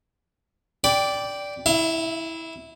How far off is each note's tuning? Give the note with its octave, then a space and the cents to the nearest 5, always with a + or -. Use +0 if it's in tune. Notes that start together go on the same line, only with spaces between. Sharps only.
D5 -10 G5 +0 B5 +0
E4 -15 E5 +40